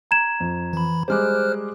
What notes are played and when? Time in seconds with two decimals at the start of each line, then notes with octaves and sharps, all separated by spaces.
0.11 A#5 G#6 E7
0.40 F2
0.73 E3 B5
1.08 G3 G#3 C5 D6 F6 F#6